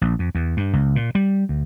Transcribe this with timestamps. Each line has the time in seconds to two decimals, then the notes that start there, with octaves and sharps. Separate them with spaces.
0.01 A#1
0.19 F2
0.35 E2
0.57 G2
0.73 C#2
0.96 A#2
1.15 G3
1.49 D2